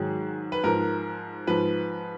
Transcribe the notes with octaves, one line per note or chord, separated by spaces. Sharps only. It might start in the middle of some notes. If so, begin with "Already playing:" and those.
Already playing: G#2 D#3 F#3 G#4
B4
G#2 F3 A#4
G#2 F3 B4